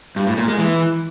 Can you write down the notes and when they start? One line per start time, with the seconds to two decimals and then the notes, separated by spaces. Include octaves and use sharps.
0.16 G2
0.27 A2
0.37 A#2
0.48 G#3
0.58 E3